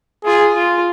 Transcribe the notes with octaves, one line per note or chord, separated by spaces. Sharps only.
F4 G#4
F4